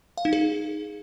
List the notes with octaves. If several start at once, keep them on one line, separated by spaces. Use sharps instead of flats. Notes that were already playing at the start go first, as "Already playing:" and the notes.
F5
D#4
G#4